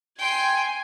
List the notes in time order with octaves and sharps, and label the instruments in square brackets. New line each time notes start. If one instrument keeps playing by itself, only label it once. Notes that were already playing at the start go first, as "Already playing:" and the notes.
[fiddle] G5 C6 [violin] G#5